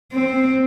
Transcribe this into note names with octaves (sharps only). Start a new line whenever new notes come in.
C4